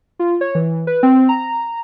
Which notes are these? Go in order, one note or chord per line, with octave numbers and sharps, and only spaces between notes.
F4
C#5
E3
B4
C4
A#5